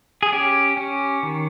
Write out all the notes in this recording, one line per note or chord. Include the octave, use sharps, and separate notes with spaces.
G#4
C#4 G4
C#4
D#3